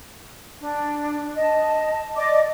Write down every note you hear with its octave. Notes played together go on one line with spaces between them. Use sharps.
D4
D#5 A5
D5 D#5 D6